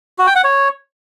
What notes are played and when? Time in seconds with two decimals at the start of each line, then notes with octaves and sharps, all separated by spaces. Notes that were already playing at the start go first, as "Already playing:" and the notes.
0.18 F#4
0.27 G5
0.35 F#5
0.44 C#5